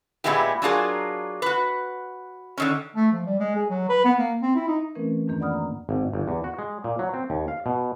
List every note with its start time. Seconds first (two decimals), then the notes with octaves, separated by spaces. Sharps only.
0.24 A#2 E3 G#3 B3 E4 G4
0.62 F#3 D4 F4 G#4 A#4
1.42 F#4 B4
2.58 D3 D#3 C#4
2.96 A3
3.12 F3
3.26 G3
3.40 G#3
3.56 G#4
3.70 F#3
3.89 B4
4.05 B3
4.18 A#3
4.42 C4
4.55 E4
4.68 D#4
4.95 E3 A3 C4 C#4 A#4 B4
5.28 F2 G#2 D#3 A#3 D4
5.40 D5 F#5 B5 D#6 F6
5.53 A#5
5.89 G#1
6.13 G1
6.28 E2
6.44 F#4
6.59 G#3
6.84 A#2
6.99 F#3
7.14 C4
7.30 D#2
7.48 F5
7.66 B2